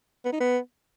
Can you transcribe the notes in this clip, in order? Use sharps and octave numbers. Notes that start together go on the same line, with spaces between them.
B3
D#4
B3